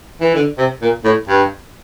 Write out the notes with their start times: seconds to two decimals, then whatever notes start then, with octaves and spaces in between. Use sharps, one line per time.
0.21 E3
0.35 D3
0.58 C3
0.82 A#2
1.04 A2
1.28 G2